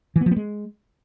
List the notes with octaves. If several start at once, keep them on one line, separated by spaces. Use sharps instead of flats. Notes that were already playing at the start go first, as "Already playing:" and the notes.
E3
B3
F3
B3
G#3